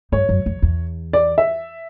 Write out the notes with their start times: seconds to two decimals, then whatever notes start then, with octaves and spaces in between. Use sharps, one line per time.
0.12 G2 C#5
0.29 F#2
0.46 F2
0.62 E2
1.13 D5
1.38 E5